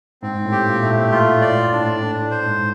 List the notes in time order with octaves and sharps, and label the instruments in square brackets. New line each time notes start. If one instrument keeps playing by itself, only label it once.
[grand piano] G#2 [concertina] C4
[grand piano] A2
[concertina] G4
[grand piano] A#2
[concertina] A3
[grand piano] A2
[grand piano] A2 [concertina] F4
[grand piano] A2
[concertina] D5
[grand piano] A2
[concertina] D4
[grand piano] A2
[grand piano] A2 [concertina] D4
[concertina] C5
[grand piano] G#2